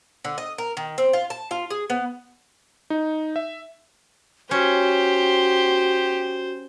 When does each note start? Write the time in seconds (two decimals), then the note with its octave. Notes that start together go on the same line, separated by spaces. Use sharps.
0.24 D3
0.38 D#5
0.58 A#4
0.77 D#3
0.98 C4
1.13 F4
1.30 A5
1.51 F4
1.70 G#4
1.90 B3
2.90 D#4
3.36 E5
4.51 C#4 F#4 G4 C5